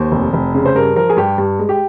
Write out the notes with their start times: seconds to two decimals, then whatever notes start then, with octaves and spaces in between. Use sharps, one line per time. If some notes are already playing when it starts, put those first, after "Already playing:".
Already playing: D#2 C5
0.12 F1
0.33 F1
0.54 C#3
0.65 C5
0.75 G2 A#4
0.96 F3 A#4
1.10 G#4
1.17 G2 G4
1.38 G2
1.59 G#3
1.69 G4